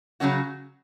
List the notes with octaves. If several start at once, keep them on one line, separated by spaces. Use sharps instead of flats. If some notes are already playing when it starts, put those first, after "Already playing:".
C#3 F#3 C#4 F#4